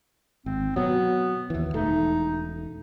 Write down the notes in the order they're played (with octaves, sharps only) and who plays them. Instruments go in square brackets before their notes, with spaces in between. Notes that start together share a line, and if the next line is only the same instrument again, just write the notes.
[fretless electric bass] G#1 [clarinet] C4
[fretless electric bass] B2 F#3 [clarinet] B3
[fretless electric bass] D#2 E3
[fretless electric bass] E1 A3 [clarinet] D#4